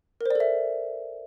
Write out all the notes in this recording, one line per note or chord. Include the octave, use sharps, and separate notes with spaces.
A4 A#4 C5 D5 E5